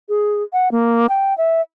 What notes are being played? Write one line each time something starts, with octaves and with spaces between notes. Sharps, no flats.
G#4
F#5
A#3
G5
E5